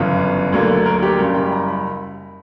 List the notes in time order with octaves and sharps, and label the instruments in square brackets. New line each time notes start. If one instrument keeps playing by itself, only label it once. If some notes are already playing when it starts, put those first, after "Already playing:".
Already playing: [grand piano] G1 F#2 C#3 E3 B3 B4
D2 D3 F#3 A#3
A#4
A#4
G4
F#1 F#2 C#3 G3 A#4
G5
B5
A#5
B5